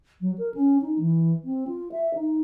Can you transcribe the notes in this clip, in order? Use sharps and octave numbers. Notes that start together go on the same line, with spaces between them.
F#3
A#4
C#4
D#4
E3
C4
F4
E5
D#4